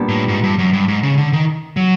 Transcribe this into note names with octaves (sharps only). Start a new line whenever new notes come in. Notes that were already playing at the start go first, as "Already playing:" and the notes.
Already playing: A#2 G3 B3 D4
A2
G#2
G2
F#2
G2
G#2
C#3
D3
D#3
F#3